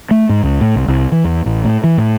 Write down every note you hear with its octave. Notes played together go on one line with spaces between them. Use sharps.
A3
G#2
C#2
A2
C2
C2
E3
E2
A1
A2
E3
A2